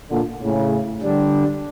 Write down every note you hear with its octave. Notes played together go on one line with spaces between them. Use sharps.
A#2 D3
A2 C#3
D3 G3 D4